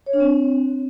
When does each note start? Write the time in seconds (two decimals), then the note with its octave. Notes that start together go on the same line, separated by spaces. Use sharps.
0.06 C#5
0.13 D4
0.20 C4